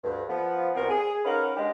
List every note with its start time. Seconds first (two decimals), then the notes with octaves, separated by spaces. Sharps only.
0.04 D2 G2
0.29 F3 B3
0.75 C2 B2 B3 C4 A#4
0.89 G#4
1.24 C#4 D#4 A#4 B4 F5 F#5
1.56 G#3 D4 G4